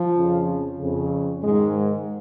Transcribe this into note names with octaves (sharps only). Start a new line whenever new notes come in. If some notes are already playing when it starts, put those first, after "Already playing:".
Already playing: F3
F2 C#3
F2 C#3
G#2 D#3 G#3